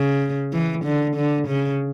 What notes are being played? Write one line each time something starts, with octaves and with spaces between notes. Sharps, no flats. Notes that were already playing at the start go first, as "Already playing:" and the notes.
Already playing: C#3
E3
D3
D3
C#3